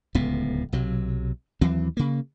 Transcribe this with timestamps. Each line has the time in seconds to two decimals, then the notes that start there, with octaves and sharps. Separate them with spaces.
0.15 D1 C#2 A2 B3
0.72 B1 C3 F#3
1.61 D#2 E3 F#3 C4
1.97 C#3 A#3